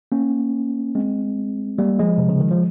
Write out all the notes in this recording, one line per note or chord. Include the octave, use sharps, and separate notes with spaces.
A#3 C#4
G#3 C4
G3 A#3
F3 G#3
C3
C#3
D#3
F3